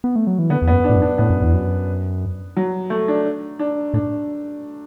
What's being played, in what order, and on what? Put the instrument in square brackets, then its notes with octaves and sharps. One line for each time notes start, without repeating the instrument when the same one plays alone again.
[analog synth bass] B3
A3
F#3
E3
[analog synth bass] D3 [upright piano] B3
[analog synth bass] E2
[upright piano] B3
[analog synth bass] F#2
[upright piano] D4
[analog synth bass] A2
F#2
[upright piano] D4
[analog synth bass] A2 [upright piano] B3
[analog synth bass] F#2
E2
F#2
[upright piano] F#3
A3
D4
D4
[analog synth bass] A2 [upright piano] D4